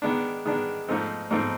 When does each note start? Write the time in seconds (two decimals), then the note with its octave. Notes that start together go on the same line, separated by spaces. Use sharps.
0.02 D#3 G#3 B3 D4
0.45 D#3 G#3 B3 D4
0.89 G#2 F3 A3 C4 D#4
1.30 G#2 F3 A3 C4 D#4